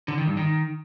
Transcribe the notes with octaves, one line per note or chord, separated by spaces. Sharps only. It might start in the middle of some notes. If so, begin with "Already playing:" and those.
D3
D#3
G2
D#3